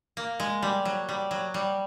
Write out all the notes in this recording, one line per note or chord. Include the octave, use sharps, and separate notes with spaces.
A#3
G#3
G3
F#3
G3
F#3
G3